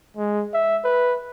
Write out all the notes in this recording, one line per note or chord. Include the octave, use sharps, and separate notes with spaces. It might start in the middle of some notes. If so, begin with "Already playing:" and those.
G#3
E5
B4